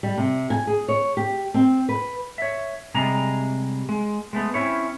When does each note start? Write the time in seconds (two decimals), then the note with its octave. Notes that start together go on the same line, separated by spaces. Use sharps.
0.03 G3
0.18 C3
0.50 G#5
0.67 G#4
0.88 C#5
1.17 G4
1.54 C4
1.89 B4
2.38 C#5 E5
2.94 C3 G3 G#3 G#4 A#5
3.89 G#3
4.33 G#3 A3 B3
4.54 C4 C#4 E4 C#5